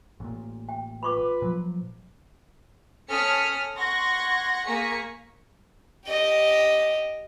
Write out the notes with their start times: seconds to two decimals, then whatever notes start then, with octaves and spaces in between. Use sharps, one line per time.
0.20 A1 A#2
0.69 G5
1.03 F4 B4 B5 C#6 D6
1.42 A#2 F3 F#3
3.10 C#4 A4 D#6 F6 B6 C#7
3.78 F#5 C6 C#6 G#6 A#6
4.65 A#3 G#4 C#6 A#6 B6 C#7
6.07 G4 D#5